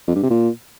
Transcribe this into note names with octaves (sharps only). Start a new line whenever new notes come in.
F2
G2
C3
A#2